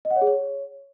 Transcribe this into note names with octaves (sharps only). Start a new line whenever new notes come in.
D#5
F#5
C#5
G#4
C#5